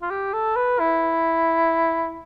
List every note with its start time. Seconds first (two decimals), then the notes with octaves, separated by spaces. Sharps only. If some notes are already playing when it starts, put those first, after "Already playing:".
0.02 F4
0.11 G4
0.34 A4
0.56 B4
0.80 E4